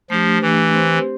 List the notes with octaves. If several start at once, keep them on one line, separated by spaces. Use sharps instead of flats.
F3 A3 D4 G4
E3 A3 D4 G4
C4 G4 C5